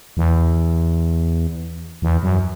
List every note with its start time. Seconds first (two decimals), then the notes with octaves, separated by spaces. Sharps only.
0.17 E2
2.02 E2
2.23 F#2